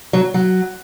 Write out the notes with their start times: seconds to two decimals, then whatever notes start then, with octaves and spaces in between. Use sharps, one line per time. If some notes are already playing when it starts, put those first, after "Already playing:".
0.13 F#3
0.34 F#3